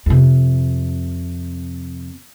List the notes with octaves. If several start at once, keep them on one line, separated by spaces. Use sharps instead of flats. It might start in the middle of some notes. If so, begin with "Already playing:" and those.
F2 C3